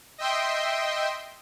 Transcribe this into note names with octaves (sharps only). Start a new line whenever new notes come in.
D#5 E5 G5 C6